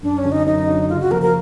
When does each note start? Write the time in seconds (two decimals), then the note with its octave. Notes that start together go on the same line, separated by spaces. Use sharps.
0.03 F#2 D4
0.18 C#4
0.25 D3 F#3
0.32 D#4
0.46 F#2 D#4
0.67 D3 F#3
0.89 C#3 F4
1.00 F#4
1.11 F3 A#3 A#4
1.22 A#4